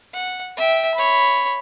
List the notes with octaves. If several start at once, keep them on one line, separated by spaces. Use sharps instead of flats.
F#5
E5 G5
C#5 B5